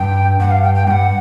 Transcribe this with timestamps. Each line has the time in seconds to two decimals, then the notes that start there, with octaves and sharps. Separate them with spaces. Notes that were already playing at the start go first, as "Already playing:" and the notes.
Already playing: G2 G5
0.39 G2 F#5
0.51 F5
0.63 G5
0.75 G5
0.87 G2 G5
0.91 F#5